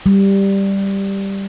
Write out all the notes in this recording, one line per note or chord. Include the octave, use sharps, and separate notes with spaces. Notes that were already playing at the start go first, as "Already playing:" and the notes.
G3